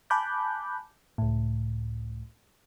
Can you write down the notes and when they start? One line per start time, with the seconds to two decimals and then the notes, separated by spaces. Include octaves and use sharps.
0.10 G#5 A5 B5 D6 F#6 G6
1.18 C#2 A2